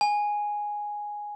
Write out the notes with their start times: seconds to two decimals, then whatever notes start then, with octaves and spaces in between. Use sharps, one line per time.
0.01 G#5